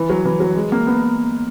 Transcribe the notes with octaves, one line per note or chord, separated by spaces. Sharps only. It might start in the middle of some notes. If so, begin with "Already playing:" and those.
Already playing: E3
F#3
E3
F#3
G#3
A#3
B3